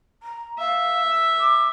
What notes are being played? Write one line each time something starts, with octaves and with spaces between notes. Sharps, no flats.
A#5
E5 F5
D6